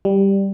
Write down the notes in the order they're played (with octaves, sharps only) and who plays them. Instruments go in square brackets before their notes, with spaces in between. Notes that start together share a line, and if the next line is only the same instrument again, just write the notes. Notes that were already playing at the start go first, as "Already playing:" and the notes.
[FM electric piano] G3